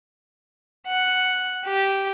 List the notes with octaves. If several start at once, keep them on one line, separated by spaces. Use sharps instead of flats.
F#5
G4